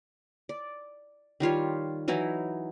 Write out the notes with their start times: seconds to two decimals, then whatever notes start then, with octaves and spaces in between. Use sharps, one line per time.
0.49 D5
1.40 D#3 G3 F4 C#5
2.08 E3 F#3 D#4 E4